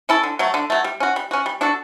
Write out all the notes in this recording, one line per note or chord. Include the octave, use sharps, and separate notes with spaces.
C#4 E4 A4
D3
F#3 A3
D3
F#3 A3
G3
C#4 F#4
G3
C#4 F#4
G3
D4 F#4 A4